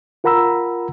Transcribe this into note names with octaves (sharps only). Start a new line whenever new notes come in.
F4 A#4 F#5 A#5 B5 E6